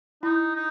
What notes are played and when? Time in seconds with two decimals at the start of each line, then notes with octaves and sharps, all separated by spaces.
0.23 D#4 E4
0.55 D#4